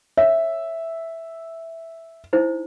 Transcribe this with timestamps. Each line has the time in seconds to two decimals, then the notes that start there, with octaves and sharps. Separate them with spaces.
0.17 C#5 E5
2.33 D#4 E4 C5